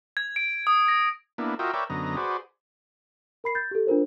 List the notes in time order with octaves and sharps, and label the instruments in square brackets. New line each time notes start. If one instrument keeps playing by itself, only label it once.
[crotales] G#6
D7
D#6
A#6
[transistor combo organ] A#3 B3 D4 E4
F4 F#4 A#4 D#5 E5 G5
A#4 B4 C#5 D5 E5 G5
F#2 D3 B3 D#5 A#5
F#4 G#4 B4 C5 D5
[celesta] A#4 B5 C7
G6 A6
G4 A4
D4 F4 A#4 C5